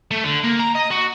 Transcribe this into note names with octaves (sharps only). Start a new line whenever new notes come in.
A3
D3
A#3
A#5
D#5
F#4